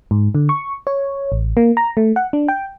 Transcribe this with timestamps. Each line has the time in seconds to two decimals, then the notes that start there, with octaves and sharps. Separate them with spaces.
0.11 G#2
0.35 D3
0.49 C#6
0.87 C#5
1.32 A1
1.57 A#3
1.77 A#5
1.97 A3
2.16 F#5
2.33 D4
2.48 G5